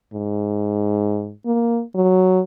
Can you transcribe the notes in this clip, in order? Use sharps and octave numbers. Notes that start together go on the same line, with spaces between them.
G#2
A#3
F#3